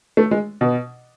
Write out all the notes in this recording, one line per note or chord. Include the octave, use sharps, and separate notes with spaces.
A3
G#3
B2